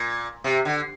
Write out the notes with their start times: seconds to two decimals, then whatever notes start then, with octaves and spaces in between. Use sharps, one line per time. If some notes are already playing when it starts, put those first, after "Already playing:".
Already playing: A#2
0.44 C3
0.65 D3